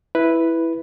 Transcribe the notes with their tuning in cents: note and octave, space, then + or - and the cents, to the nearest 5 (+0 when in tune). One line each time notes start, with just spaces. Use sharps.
E4 +0 B4 +0